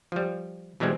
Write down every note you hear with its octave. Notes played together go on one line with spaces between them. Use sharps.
F3 G3
B2 E3 G3 G#3 C4